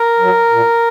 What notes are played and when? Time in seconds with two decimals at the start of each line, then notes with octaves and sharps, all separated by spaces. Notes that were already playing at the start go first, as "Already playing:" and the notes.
Already playing: A#4
0.19 F#3
0.50 A#2